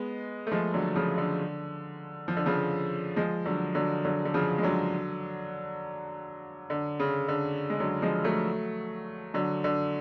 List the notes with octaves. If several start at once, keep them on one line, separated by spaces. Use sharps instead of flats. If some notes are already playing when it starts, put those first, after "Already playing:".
Already playing: G#3 B3
A3
F3 G#3
D3 F#3
C#3 F3
D3
F3
D3
C#3 F3
F3 G#3
D3 F#3
D3 F#3
D3 F#3
D3
C#3 F3
G#3
D3 F#3
D3
C#3
D3
G#3
D3 F#3
F3 G#3
F#3 A3
D3 F#3
D3